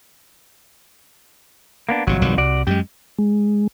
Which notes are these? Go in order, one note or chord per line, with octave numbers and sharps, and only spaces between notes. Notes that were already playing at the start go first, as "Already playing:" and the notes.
A#3 B3 D4
G1 F2 C3 F#3
B1 D#3 G3
C2 F#4 D5
F#2 G#3 G4
G#3